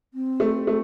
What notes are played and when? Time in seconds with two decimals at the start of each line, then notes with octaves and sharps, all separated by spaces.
0.13 C4
0.40 A3
0.67 A3